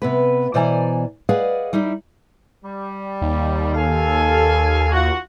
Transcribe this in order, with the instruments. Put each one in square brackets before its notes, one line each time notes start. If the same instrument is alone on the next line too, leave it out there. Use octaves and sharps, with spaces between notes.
[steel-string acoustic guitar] C3 B3 B4
B2 E3 C5 D5 G#5 A#5
G#4 B4 D5 D#5 F5 F#5
G3 D#4 E4 G4
[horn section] G3
[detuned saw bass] D#2
[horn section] A4 F5 G#5
F4 F#4 F#5